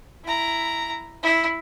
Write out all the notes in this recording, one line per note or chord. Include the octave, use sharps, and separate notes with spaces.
E4 A#5
E4